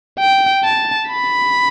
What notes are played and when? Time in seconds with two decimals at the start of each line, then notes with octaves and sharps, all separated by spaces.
0.20 G5
0.64 A5
1.09 B5